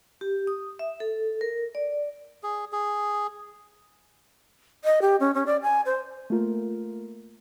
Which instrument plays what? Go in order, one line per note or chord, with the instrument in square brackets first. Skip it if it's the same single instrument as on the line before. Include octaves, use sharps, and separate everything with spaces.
[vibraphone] G4
D#6
E5
A4
A#4
D5
[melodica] G#4
G#4
[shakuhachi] D#5
G4
C#4
C#4
D5
G#5
C5
[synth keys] A3 A#3 F4 A#4